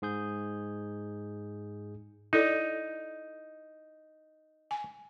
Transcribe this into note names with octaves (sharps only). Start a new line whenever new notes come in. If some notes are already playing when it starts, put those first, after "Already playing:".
G#2 G#4 G6
D#4 E4 A4 D5
G#5